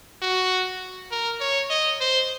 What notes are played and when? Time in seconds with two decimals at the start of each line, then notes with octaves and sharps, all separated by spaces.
0.22 F#4
1.12 A#4
1.40 C#5
1.70 D#5
2.00 C5